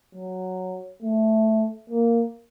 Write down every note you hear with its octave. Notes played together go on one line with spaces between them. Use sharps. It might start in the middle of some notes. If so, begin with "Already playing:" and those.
F#3
A3
A#3